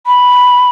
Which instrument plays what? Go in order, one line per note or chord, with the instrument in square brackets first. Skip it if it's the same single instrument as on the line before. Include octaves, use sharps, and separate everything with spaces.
[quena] B5